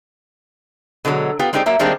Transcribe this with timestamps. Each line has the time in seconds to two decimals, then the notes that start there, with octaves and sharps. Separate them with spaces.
1.05 B2 D3 E3 F#3 G#3
1.39 B3 F4 G4
1.53 G#3 C4 D#4 G4 C5 D5
1.66 F#3 A#3 E5
1.79 D#3 G3 G#3 A#3 C4 D4